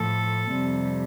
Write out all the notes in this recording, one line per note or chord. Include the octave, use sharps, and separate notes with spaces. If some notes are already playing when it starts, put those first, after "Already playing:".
Already playing: A2 F3 A4
F2 C3 G3